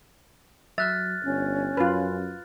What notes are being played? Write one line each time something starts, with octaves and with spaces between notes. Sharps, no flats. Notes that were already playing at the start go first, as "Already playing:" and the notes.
F#3 E5 F6 F#6 A6
G1 C#4
F#2 F4 B4